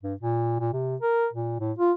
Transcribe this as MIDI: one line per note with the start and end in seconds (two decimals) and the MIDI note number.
0.03 0.14 43
0.21 0.56 46
0.60 0.71 46
0.73 0.96 48
1.02 1.28 70
1.33 1.56 46
1.60 1.72 45
1.78 1.93 65